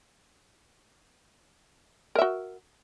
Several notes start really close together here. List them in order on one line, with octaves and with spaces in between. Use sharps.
A#4 E5 F#4